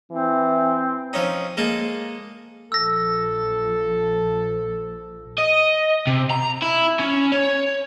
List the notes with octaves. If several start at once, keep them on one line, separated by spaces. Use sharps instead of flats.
E3 C4
F3 C#4 D#4
G#3 A#3 G#4 A4
A#1 F3 A4 E6 A#6
D#5
C3
A#5
E4
C#4
C#5